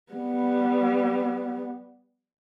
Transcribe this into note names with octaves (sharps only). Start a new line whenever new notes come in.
G3 B3